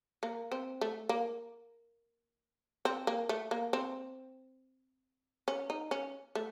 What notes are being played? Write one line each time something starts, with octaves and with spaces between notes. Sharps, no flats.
A#3
C4
A3
A#3
C4
A#3
A3
A#3
C4
C#4
D#4
C#4
A3